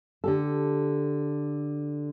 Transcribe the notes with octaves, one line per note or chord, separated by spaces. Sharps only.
D3 G4 A4